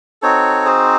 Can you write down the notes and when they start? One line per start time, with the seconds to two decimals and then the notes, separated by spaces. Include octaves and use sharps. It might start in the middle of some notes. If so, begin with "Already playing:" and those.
0.22 C4 D#4 F#4 A4 C#5
0.65 G#4 C5